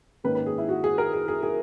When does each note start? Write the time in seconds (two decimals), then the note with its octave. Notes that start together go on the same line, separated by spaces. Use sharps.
0.24 G#2 D#3 A#3 C#4 B4
0.35 B4
0.46 G#4
0.58 E4
0.69 F#4
0.84 G#4
0.98 A#4
1.14 G#4
1.28 G#4
1.43 G#4